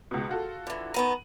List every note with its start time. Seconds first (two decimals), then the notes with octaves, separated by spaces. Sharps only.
0.11 C#2 B2
0.29 F4 F#4 A4
0.67 D3 E3
0.94 D#3 B3 A#5 D#7